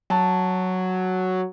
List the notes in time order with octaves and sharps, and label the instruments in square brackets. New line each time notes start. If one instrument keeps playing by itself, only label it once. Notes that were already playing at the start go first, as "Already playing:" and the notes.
[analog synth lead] F#3 [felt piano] A5